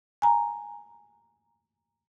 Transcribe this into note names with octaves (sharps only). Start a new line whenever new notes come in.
G#5 A#5